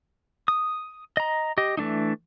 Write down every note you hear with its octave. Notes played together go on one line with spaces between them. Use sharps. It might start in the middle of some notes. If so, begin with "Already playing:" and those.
D#6
D#5 A#5
G4 D#5
E3 A3 D4 D#4